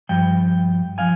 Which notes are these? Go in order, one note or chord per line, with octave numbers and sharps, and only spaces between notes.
G2 F3 G5
F3 F5 G#5